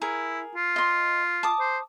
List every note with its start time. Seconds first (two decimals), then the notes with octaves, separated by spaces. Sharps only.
0.02 E4 G#4 A#4
0.55 F4
0.76 D#5 C6
1.43 A5 D6 D#6
1.60 C5